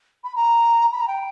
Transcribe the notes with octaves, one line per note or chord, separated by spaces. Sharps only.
B5
A#5
B5
A#5
G5